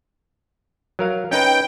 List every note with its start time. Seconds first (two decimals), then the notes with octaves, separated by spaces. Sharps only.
0.99 F#3 A#4 F5
1.31 C#4 D#4 B4 G5